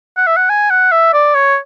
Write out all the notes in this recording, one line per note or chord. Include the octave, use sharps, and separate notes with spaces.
F#5
E5
F#5
G#5
F#5
E5
D5
C#5